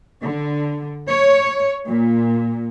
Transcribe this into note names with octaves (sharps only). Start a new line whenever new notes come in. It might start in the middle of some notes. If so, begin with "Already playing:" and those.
D3
C#5
A#2